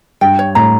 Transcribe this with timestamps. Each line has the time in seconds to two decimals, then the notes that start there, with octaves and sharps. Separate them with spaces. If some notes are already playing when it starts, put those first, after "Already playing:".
0.21 G2 G5
0.39 C#5
0.55 A2 A#5